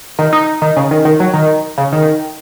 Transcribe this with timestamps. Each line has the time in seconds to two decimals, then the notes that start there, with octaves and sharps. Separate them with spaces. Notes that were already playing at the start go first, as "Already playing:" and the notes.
0.19 D#3
0.33 D#4
0.62 D#3
0.76 C#3
0.91 D#3
1.05 D#3
1.20 F#3
1.33 D#3
1.78 C#3
1.92 D#3